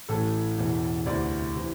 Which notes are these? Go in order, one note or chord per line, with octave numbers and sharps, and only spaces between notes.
A1 A2 E3 A4
E1 E2 E3
D2 C3 E3 D5
C3 E3